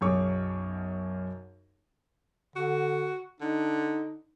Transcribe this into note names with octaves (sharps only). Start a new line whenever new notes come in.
B1 F#2 G#4 C#5 C#6 D6
D3 F#4
D3 D#4